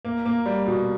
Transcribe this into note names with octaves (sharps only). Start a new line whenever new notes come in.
A#3
A#3
G3
B2